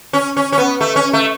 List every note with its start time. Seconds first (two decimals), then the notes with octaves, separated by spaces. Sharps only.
0.13 C#4
0.37 C#4
0.53 C#4
0.58 B3
0.81 A3
0.96 C#4
1.13 A3